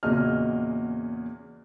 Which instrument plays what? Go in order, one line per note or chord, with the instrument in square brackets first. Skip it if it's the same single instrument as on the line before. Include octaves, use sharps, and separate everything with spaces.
[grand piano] E2 A#2 C#3 F#4 D#5 F6